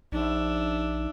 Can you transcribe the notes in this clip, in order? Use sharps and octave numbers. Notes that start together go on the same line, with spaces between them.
A#1 D4 D#4 E5